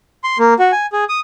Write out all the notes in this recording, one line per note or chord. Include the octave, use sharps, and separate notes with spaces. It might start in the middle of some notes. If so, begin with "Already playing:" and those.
C6
A#3
F#4
G#5
G#4
D#6